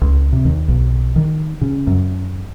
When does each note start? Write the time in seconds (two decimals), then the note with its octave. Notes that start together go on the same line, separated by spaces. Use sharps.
0.02 C#2
0.33 C3
0.45 D#2
0.68 B1
1.16 D#3
1.61 C#3
1.87 F#2